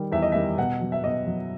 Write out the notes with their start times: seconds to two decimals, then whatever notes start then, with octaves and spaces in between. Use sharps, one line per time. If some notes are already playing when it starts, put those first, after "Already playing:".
Already playing: D#3 G3
0.12 E2 E5
0.22 D#5
0.32 D#3 G3 E5
0.58 B2 F#5
0.81 F#3
0.92 E5
1.04 B2 D#5
1.27 F#3